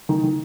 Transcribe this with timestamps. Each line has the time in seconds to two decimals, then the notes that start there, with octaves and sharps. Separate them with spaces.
0.09 D#3
0.23 D#3